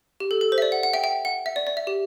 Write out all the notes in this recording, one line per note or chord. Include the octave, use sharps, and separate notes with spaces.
G4
A4
A4
C5
E5
D5
F#5
F#5
E5 G5
E5 G5
F#5
E5
D5
D5
E5
G4